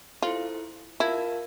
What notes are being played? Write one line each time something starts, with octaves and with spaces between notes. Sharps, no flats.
E4 F4 A4 C5
E4 F4 A#4 F5 A5